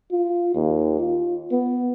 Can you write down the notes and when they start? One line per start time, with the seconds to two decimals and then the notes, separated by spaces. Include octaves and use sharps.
0.12 F4
0.55 D#2
0.99 F4
1.51 B3